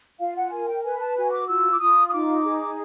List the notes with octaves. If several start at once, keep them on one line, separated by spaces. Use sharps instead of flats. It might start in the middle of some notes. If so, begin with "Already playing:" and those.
F4 F5
F#5
A#4 G#5
G5
B4 G#5
A5
F#4 G#5
D6
F4 E6
D6
F4 D#6
D#6
D#4 D6
G#4